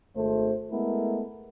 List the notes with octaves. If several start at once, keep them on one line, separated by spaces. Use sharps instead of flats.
G#1 A3 C5
G#3 A3 B3 E4 A4 A#4